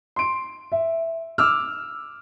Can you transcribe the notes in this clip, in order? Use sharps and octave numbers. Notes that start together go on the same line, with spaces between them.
C6 D7
E5
D6 E6 F6